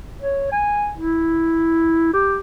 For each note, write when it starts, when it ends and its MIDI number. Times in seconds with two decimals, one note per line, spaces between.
0.22 0.50 73
0.52 0.92 80
0.98 2.11 64
2.14 2.38 67